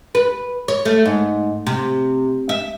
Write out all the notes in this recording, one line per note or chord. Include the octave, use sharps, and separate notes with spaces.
B4
C#5
A3
G#2
C3
E5